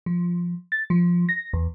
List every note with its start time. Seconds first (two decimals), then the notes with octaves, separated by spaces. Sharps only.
0.06 F3
0.72 A6
0.90 F3
1.29 A#6
1.53 E2